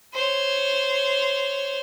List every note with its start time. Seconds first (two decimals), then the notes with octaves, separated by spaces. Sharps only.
0.14 C5 C#5